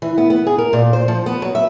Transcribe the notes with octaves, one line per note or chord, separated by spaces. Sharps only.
E3
B3
B3
G#4
A#4
A#2
C5
F3
B3
F#3
E5